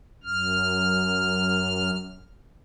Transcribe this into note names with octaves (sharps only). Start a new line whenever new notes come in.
F#2 F6